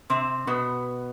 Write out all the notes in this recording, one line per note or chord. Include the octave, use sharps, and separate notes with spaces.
C3 C4
B2 B3